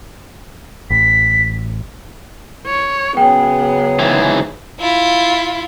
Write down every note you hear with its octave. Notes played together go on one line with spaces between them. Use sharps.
A1 B6
C#5
C#3 F#3 B3 G#4 G5
G#2 E3
E4 F4